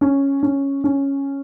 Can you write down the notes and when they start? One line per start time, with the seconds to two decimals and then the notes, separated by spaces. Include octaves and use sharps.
0.01 C#4
0.43 C#4
0.84 C#4